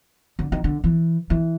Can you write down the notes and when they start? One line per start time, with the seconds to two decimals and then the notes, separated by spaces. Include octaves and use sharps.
0.39 D3
0.52 D#3
0.64 D3
0.84 E3
1.30 E3